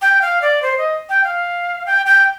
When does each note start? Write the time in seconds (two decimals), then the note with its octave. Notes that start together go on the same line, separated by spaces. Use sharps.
0.02 G5
0.22 F5
0.42 D5
0.62 C5
0.78 D#5
1.09 G5
1.24 F5
1.86 G5
2.06 G5